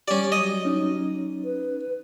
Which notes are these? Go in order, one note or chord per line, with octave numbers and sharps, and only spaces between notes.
G3 C#4 G4 D5
F#3 D#5
C#4 D#4
B4